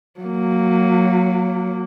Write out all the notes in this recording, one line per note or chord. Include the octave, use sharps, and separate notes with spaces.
F#3 A#3